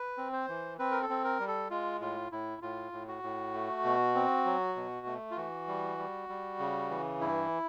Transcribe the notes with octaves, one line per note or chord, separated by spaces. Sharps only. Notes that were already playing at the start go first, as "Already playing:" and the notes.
Already playing: B4
C4
C5
E3
C4 B4
A#4
A4
C4
A#4
G3
A4
G#3 F4
A2 F4
A2 E4
A2 F4
A2
F#4
A2
A3
B2
C4
F#3
B2
A3
F4
E3 F#4
G3
G3
G3
C#3
E3
G2 E4